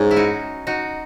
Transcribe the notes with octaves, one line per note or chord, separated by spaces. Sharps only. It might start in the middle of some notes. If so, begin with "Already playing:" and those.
Already playing: G#2 C#4
E4
D#4 F#4
D#4 F#4